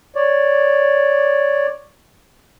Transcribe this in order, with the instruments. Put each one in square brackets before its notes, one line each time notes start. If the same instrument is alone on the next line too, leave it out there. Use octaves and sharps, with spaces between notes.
[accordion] C#5 D5